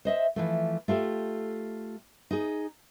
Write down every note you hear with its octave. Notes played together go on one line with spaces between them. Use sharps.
C5 D#5 E5
E3 F3 A3
A3 F4 G4 A4
D#4 G#4